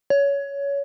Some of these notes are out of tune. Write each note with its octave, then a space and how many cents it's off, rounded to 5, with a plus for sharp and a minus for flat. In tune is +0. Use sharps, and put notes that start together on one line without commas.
C#5 +20